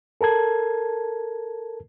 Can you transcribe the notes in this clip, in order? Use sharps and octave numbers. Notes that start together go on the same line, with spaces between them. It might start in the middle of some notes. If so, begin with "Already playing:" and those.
A4 A#4 A5 G#6